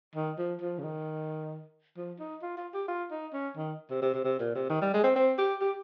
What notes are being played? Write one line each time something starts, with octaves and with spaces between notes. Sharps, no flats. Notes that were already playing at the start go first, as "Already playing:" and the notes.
D#3
F3
F3
C#3
D#3
F3
D#4
F4
F4
G4
F4
D#4
C#4
D#3
C3
C3
C3
C3
A#2
C3
D#3
G3
G#3
C4
C4
G4
G4